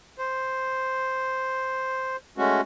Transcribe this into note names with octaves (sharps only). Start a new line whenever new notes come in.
C5
G#3 A3 C#4 F#4